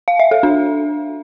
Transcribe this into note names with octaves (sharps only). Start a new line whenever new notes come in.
F5
E5
A4
D4